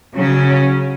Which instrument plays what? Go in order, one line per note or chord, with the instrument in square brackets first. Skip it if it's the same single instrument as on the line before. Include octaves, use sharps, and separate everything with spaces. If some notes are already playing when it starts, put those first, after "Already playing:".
[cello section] C#3 F#3 C#4